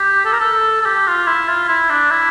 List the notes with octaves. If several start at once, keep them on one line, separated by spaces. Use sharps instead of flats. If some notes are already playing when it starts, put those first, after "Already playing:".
Already playing: G4
A4
A#4
A4
A4
G4
F4
E4
F4
E4
D4
E4